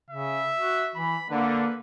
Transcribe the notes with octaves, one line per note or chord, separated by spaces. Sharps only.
C#3 E5
F#4
E3 B5
D3 A#3 B4